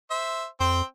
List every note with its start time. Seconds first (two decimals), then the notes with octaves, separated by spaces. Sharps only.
0.11 C5 E5
0.60 F2 C4 C5 G5